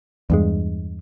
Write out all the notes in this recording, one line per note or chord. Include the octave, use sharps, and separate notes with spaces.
E2 G2 G#3